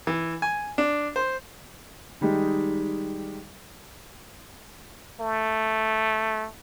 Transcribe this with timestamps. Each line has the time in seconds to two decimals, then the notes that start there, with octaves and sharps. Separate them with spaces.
0.07 E3
0.42 G#5
0.78 D4
1.16 C5
2.21 D#3 G3 G#3 D#4 G4
5.21 A3